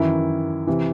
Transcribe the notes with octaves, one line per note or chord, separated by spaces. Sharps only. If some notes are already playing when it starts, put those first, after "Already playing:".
Already playing: F#2 D#3 E3 E4
C3 E3